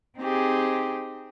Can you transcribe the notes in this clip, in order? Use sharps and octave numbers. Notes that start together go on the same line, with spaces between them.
C4 D#4 G4 G#4